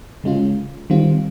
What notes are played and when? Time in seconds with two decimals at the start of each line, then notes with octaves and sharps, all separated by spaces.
0.24 C#3 G#3 C#4 F4
0.90 D#3 G3 C4 F4